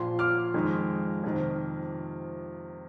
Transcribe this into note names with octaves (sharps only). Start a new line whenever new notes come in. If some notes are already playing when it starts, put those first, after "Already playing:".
Already playing: A#1 A#2 F3 C6
D6 F6
F2 D#3 G#3 D#4
F2 C3 D#3